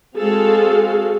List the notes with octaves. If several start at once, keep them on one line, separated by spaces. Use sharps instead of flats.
G#3 C4 F#4 G#4 A4 F5